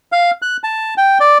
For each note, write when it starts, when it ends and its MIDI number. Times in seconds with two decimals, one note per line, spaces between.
0.12 0.31 77
0.42 0.57 90
0.64 0.94 81
0.98 1.18 79
1.20 1.38 74